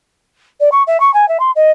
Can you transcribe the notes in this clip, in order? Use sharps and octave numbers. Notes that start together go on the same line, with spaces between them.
D5
C#6
E5
C#6
G#5
E5
C6
D#5